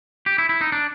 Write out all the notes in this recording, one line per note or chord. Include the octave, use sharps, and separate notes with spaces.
G4
E4
E4
D#4
D4